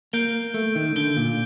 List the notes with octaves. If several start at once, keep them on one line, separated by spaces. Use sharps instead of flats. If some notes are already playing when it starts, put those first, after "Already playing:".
A#3 G6 D7 G7
A3
D#3
D3 G6 D7 G7
A#2